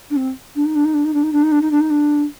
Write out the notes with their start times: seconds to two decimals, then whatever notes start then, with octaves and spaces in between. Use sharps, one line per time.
0.10 D4
0.16 C4
0.55 D4
0.65 D#4
0.75 D4
0.84 D#4
0.94 D4
1.04 D#4
1.13 D4
1.23 D#4
1.32 D4
1.43 D#4
1.51 D4
1.61 D#4
1.71 D4
1.80 D#4
1.90 D4